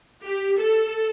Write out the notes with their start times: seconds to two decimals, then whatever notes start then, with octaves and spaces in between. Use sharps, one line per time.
0.24 G4
0.57 A4